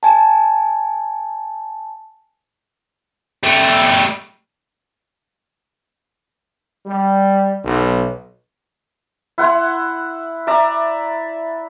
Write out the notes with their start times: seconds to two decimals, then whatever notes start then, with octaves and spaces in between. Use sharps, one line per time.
0.03 G#5 A5
3.44 G3 A3
6.86 G3
7.64 B1
9.38 E4 F#5 C6
10.47 D5 E5 A#5